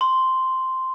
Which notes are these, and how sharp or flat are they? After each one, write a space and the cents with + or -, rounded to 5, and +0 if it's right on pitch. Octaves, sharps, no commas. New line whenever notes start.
C6 -5